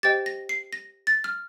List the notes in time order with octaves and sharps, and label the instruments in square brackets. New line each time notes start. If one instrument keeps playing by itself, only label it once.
[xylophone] G4 C5 D#5 G5 A6
A#6
C7
A#6
A6
F6